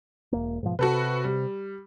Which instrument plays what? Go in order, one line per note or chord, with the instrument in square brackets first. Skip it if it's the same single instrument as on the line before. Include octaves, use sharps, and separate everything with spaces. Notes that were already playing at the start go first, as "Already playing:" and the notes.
[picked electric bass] E1 A#3
G#2 B2 F3
[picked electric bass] C3 [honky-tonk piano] F#4 A4 B4
[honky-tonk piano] G3